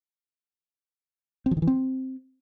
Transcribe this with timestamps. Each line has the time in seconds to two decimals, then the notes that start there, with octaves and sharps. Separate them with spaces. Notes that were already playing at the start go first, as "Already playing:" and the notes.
1.46 C4
1.51 F3
1.57 D#3
1.62 E3
1.67 C4